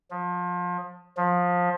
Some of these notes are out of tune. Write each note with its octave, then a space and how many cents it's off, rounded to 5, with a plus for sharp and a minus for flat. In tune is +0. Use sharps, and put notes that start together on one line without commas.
F3 +30
F3 +20